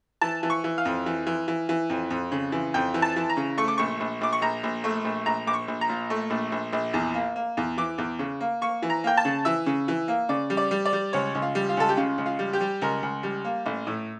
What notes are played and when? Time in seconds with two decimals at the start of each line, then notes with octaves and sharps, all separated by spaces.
0.21 E3 A5
0.43 E3
0.50 C#6
0.64 E3
0.78 F5
0.85 F2
1.06 E3
1.27 E3
1.48 E3
1.69 E3
1.90 F2
2.10 F2
2.32 C#3
2.52 E3
2.74 F2 G5
2.94 E3
3.02 A5
3.16 E3
3.30 A#5
3.37 C#3
3.58 A3 C#6
3.68 D6
3.78 A#1 C#6
4.00 A#1
4.21 A#1 D6
4.33 C#6
4.41 A#1 A#5
4.63 A#1
4.84 A3
5.05 A#1
5.26 A#1 A#5
5.47 A#1 D6
5.53 C#6
5.68 A#1
5.81 A#5
5.89 A#2
6.10 A3
6.30 A#1
6.52 A#1
6.73 A#1
6.94 E2
7.14 A#3
7.36 A#3
7.57 E2
7.77 E3 D6
7.98 E2
8.19 C#3
8.41 A#3
8.61 A#3 C#6
8.82 E3
8.90 A#5
9.04 A#3 G5
9.17 A5
9.25 C#3
9.45 E3 E5
9.66 C#3
9.88 E3
10.08 A#3
10.29 C#3 D5
10.50 G3
10.57 D5
10.71 G3
10.85 D5
10.93 G3
11.13 C#2 C#5
11.35 C#2
11.42 F4
11.55 G3
11.69 F4
11.77 C#2 A4
11.89 G4
11.97 C#3 F4
12.18 C#2
12.26 F4
12.39 G3
12.53 G4
12.60 G3
12.81 C#2 A#4
13.03 C#2
13.23 G3
13.45 A#3
13.66 A1
13.87 A2